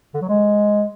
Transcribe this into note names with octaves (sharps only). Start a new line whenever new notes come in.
D3
F#3
G#3